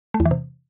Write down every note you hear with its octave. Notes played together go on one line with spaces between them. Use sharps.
A3
E2
E3
C3